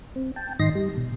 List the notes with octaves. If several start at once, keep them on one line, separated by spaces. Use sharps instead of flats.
C4
G5 A5
G#2 D#3 D#5 C6 A#6
G3
B2